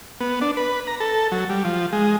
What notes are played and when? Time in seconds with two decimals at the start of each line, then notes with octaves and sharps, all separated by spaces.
0.20 B3
0.41 D4
0.57 B4
0.87 A#5
1.00 A4
1.32 F#3
1.50 G3
1.65 F3
1.93 G#3